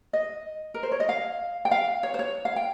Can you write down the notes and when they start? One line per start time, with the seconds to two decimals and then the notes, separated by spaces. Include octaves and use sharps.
0.13 D#5
0.74 A#4
0.83 C5
0.92 C#5
1.00 D#5
1.09 F5
1.65 G5
1.71 F5
2.03 C#5
2.14 C5
2.19 C#5
2.45 F5
2.56 G5